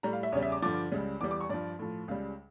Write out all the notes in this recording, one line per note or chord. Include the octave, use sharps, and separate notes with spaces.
A2 G3 A#5
F5
E5
E2 C#3 G3 C#5
E5
D6
G2 D3 F3 D6
C#2 C#3 G3
E2 E3 G3 D6
D6
C#6
G2 F3 D5
A2 F3
C#2 C#3 G3 F5